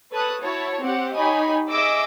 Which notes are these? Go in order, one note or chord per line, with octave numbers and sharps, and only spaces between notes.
A4 B4 C#5 A5 D#6 F#6
E4 F#4 C#5 A5
C4 G4 F#5
D#4 G4 C#5 D#5 G#5 B5
G#4 D#5 E5 D6 E6